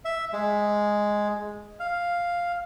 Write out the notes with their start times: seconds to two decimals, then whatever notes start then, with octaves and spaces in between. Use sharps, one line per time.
0.05 E5
0.33 G#3
1.80 F5